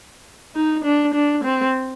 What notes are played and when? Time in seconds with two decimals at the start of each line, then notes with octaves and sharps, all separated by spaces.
0.56 D#4
0.84 D4
1.14 D4
1.44 C4